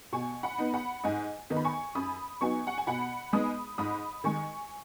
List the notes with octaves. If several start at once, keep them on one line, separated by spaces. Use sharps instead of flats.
B2 G#5 C#6
F#5 B5
B3 D#4
F#5 B5
G#2 D#5 G#5
D#3 B3 D#4
B5
G#5 C#6
F#2 B5 D#6
F#3 B3 D#4 G#5 C#6
F#5
G#5
B2 F#5 B5
G#3 B3 D#4 B5 D#6
G#2 B5 D#6
D#3 G#3 G#5 C#6